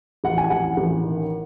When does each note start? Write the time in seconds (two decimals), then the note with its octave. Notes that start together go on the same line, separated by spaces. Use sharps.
0.24 A1 F#5
0.38 G#5
0.50 A1 F#5
0.77 A1
1.04 D#3